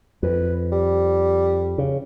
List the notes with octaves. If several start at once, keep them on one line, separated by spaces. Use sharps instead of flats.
F2 B4
G3
C#3